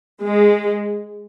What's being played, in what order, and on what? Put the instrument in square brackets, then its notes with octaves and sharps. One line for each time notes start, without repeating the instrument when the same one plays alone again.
[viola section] G#3